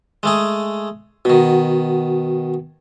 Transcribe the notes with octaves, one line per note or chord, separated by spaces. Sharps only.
G#3 A3 G#4
B2 D#3 F#4